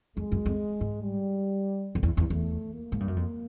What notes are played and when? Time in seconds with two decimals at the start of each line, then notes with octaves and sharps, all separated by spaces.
0.17 F2 G#3
0.32 F#2
0.46 F2
0.81 G#2
1.02 G3
1.95 F2
2.03 E2
2.17 E2
2.30 E2 A3
2.73 A#3
2.92 G#2
3.00 G2
3.08 F#2
3.16 F2 A#3